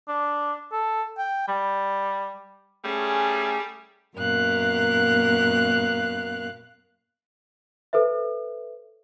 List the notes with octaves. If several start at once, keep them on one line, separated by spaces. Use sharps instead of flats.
D4
A4
G5
G3
G3 A3 C#4 G#4
F#2 A#2 B3 A#4 F5 F#6
A4 B4 C5 E5